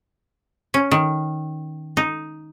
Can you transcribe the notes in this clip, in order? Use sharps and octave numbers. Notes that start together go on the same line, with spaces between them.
C#4
D#3
D#4